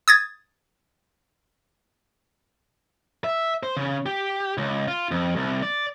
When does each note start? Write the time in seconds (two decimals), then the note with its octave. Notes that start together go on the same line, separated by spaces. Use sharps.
0.08 D#6 G#6 A6
3.24 E5
3.63 C5
3.77 C#3
4.06 G4
4.58 C#2
4.88 F4
5.11 F2
5.36 C2
5.63 D5